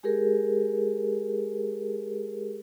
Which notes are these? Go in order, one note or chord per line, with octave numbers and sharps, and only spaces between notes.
G#3 G4 G#4 A#4